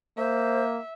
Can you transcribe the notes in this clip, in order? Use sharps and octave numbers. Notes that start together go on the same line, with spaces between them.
A#3 C5 E5